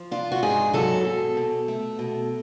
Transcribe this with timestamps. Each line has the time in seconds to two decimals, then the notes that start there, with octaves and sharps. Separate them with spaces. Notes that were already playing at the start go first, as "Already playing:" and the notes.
Already playing: F3
0.11 D4 F4
0.32 F#4
0.43 G#2 G#4
0.73 F#3 A4
1.05 B2
1.37 B2
1.68 A3
1.99 B2